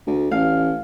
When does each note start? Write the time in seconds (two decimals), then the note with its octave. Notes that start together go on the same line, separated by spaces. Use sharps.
0.07 D2
0.31 A1 F5